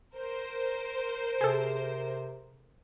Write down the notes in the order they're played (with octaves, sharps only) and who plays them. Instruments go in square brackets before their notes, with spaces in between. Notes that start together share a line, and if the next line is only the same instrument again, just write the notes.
[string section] A#4 C5
[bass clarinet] C3 [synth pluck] G#4 A4